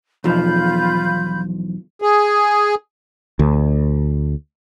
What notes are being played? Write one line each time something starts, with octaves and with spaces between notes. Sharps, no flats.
B1 E2 F3 F4 B5 G6
G#4
D2